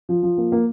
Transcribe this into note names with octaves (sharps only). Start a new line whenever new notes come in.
F3
F3
A#3
A#3